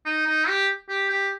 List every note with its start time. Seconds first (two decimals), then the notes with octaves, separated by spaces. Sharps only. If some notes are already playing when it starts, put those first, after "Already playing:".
0.06 D#4
0.26 D#4
0.48 G4
0.89 G4
1.10 G4